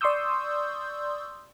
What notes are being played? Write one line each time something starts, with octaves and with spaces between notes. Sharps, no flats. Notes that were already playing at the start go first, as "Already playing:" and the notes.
D5 C6 C#6 D#6 E6 G6